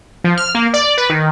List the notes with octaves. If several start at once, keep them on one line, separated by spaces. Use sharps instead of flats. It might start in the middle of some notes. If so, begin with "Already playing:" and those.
F3
F6
A#3
D5
B4
D#3